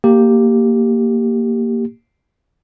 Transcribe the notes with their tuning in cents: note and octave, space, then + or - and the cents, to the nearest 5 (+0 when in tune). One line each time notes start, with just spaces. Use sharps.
A#3 -10 G4 +0